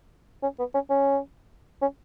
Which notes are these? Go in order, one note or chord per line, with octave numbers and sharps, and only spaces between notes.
C#4
B3
C#4
C#4
C#4